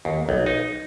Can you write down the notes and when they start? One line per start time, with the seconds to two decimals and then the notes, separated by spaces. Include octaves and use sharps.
0.05 D#2
0.29 B1
0.46 D#4